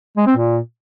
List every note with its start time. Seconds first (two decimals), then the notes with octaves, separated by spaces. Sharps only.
0.17 G#3
0.27 C4
0.37 A#2